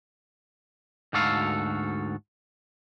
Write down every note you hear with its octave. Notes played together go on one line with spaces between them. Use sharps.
D2 G#2 F#4 A4 F5